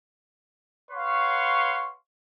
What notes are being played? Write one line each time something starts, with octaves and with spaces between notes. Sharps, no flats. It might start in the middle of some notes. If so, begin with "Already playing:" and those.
B4 C#5 F5 F#5 C6 C#6